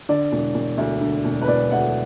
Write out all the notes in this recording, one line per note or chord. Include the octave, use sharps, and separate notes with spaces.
D3 D5
E1
E1
D2
D3
E1
B4
E1 D5
D2 F#5